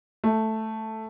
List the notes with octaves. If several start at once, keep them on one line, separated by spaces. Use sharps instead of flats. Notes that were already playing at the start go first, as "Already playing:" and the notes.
A3